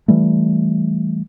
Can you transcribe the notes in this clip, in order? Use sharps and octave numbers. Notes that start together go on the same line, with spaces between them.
E3 G3 A3